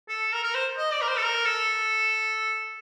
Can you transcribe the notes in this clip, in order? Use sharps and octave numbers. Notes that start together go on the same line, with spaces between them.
A4
A#4
A#4
C5
D#5
D5
A#4
C5
A4
A#4
A4